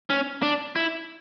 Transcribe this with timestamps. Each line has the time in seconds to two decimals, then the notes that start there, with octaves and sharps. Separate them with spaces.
0.10 C#4
0.43 D4
0.76 E4